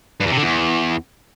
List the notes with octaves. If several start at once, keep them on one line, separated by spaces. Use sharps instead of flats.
G2
E2
C3
D3
E2